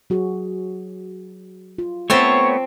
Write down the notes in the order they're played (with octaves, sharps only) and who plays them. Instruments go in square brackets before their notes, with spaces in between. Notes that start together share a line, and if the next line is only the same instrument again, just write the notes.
[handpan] F#3 F#4 G#4
F4
[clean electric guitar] A3 B3 [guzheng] C4 A5 C6 [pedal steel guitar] C#5